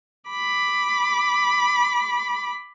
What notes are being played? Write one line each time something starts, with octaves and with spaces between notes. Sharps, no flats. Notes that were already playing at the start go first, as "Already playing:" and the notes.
B5 D6